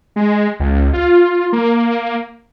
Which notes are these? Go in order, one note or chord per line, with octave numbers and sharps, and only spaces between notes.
G#3
C#2
F4
A#3